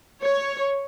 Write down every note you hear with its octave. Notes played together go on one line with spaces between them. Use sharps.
C#5